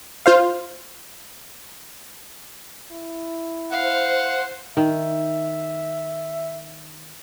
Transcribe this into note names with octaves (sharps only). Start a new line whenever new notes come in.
F4 C5 F5
E4
C5 F5 F#5
D#3 E5